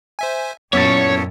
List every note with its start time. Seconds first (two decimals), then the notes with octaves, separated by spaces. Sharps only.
0.19 C5 E5 G#5
0.73 F#2 A#2 B3 C#4 E4 A4 C#5